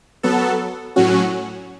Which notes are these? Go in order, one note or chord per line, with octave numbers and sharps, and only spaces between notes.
F#3 B3 A4
A2 F#3 C#4 F#4